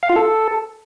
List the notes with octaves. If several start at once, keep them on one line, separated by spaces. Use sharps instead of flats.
F5
F4
A4